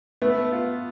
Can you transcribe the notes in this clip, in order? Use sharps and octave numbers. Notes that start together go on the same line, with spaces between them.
A3 B3
F4